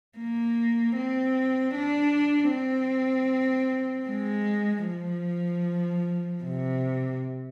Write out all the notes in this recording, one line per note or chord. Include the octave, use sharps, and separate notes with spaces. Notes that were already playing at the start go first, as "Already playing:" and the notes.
A#3
C4
D4
C4
G#3
F3
C3